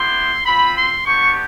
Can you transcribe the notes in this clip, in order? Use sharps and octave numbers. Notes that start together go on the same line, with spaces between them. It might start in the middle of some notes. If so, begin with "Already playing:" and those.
Already playing: B3 E4 G4 C6
C4 F4 B5
C6
B3 D4 G4 C#6